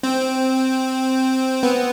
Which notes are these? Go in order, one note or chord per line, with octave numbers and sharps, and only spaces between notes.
C4
B3